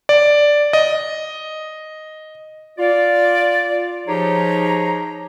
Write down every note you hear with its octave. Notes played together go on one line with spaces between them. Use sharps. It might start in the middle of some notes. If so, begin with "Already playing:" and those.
D5
D#5
F4 D5
F3 D#4 G4 G#4 C#5 A#5